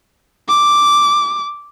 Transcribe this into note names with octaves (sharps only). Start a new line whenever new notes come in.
D6